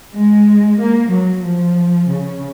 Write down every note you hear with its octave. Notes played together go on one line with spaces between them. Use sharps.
G#3
A#3
F#3
F3
C#3